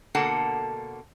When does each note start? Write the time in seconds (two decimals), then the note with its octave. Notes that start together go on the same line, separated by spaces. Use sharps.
0.15 B2 D3 A#3 A4 F#5 A5